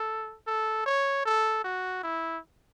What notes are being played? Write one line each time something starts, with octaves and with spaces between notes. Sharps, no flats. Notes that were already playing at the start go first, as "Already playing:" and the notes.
Already playing: A4
A4
C#5
A4
F#4
E4